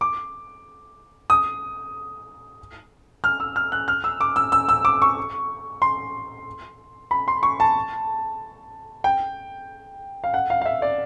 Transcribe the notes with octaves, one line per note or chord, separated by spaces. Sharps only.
D6
D#6
F6
E6
F6
F#6
F6
E6
D6
E6
E6
E6
D6
C#6
C6
B5
C6
C#6
A5
G5
F5
F#5
F5
F5
E5
D5